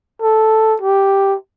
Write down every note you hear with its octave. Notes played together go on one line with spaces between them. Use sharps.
A4
G4